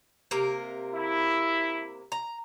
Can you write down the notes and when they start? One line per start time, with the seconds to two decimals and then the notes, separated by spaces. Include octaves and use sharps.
0.31 C3 A#3 A#4
0.95 E4
2.12 A#5